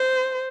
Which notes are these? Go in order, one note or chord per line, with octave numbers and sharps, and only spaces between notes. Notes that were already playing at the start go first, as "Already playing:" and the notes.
Already playing: C5